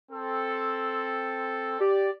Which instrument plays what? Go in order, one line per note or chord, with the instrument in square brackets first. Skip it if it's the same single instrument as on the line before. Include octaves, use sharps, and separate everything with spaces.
[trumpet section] C4 A4
[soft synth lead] G4 [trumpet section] D5